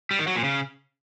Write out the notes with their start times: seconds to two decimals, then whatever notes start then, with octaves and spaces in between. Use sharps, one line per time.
0.11 G3
0.19 D#3
0.27 F#3
0.36 A#2
0.44 C#3